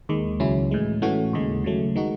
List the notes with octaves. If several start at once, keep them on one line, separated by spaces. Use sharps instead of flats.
D#2 D#3 G#3
C#2 C#3 F#3 C#4 E4
A2 E3 G#3
A2 E3 A3 C#4 F#4
D#2 C#3 G#3
C#3 F#3 A3
D#3 G#3 D#4 F#4